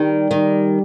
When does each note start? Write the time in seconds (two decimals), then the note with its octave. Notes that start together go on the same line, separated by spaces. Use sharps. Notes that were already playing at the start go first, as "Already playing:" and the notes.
Already playing: D#3 G3
0.31 D#3